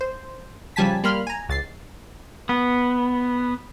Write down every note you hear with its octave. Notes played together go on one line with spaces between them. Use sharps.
C5
C#3 F3 G3 G#5 A5 B6
G3 A#3 B5 C6 F6
G#5 A#5
C#2 A6 C7
B3